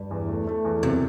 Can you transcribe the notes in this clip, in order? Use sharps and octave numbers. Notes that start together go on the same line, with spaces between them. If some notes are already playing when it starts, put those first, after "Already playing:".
Already playing: G2
E2
A3
A3
E2
F#2 C3